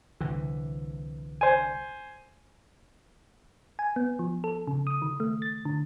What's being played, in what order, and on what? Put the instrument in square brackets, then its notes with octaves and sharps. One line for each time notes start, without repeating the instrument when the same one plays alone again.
[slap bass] C2 D3 E3
[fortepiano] C5 G#5
[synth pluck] G#5
B3
F3
A4
C#3
D#6
D#3
A3
A6
D3